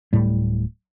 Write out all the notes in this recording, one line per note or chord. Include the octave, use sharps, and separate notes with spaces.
D1 A2 G3